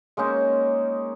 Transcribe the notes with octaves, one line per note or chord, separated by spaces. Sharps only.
G#3 A#3 C#4 D#4